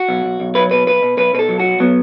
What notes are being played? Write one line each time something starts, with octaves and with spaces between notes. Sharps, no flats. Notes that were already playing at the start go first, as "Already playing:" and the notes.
Already playing: F#4
B1
B1
B1
F#3 B4
B2 B4
B1 B4
B2
B1 B4
B2 B4
A4
F#3
B1 F#4
F#3 B3